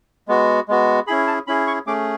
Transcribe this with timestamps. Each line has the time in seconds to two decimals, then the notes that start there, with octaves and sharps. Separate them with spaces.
0.28 G#3 B3 F#4
0.68 G#3 B3 F#4
1.07 C#4 E4 G#4 B5
1.27 A5
1.47 C#4 E4 G#4 B5
1.67 C#6
1.87 A3 C#4 G#4 D6